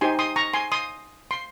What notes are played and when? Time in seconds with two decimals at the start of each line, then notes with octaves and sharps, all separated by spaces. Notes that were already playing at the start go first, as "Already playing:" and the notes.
0.01 D#4 G4 C5 G#5 C6
0.19 C6 D#6
0.36 A#5 C#6
0.54 G#5 C6
0.72 C6 D#6
1.31 C6